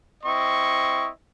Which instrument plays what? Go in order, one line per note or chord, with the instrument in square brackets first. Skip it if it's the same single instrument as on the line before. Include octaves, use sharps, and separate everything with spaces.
[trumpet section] C4 E4 D#5 C#6